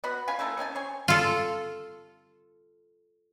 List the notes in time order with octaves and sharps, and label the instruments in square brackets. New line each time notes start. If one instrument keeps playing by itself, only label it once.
[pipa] B3 F#4 F#5 B5
C#4 F4 G#5 B5
A3 A#3 E4 A4
C3 C#4 G#5 A5
C5 C#5 G#5
[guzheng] F4 A4